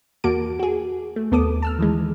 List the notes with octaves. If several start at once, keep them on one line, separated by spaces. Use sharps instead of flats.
E2 A#3 F#4 A5 D6 D7
F#4 G#4
A3
D#2 B3 A4 D6 D#6
A5 E6 F6
D#3 E3 G#3